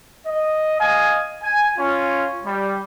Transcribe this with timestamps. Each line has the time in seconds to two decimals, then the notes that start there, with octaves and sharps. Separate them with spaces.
0.26 D#5
0.78 D#5 F5 G#5
1.43 G#5
1.78 C#4 F4
2.44 G3